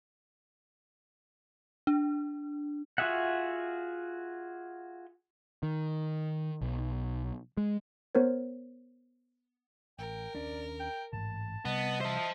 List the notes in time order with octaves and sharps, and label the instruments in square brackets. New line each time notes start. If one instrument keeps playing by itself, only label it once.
[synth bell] D4
[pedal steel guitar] F4 F#4 G#4 E5 F#5
[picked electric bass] D#3
B1
G#3
[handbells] B3 A#4 C5 C#5
[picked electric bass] A1 [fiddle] A#4 [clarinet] G5
[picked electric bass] D#2 C#4 D4 [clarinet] D5
[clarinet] G5
[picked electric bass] A1 G#2 C#3 [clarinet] A5
[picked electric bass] C3 G3 [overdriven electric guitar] B3 [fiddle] D#5
[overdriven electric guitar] C5 A5 [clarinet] E5